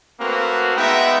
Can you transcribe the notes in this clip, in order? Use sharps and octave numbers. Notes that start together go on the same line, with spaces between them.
A3 A#3 C4 F#4 B4
G#3 B3 D#4 E5 G5